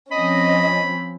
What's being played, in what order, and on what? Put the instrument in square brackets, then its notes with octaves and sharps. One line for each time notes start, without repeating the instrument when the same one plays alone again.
[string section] F3 C4 C#4 [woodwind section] D#5 [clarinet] B5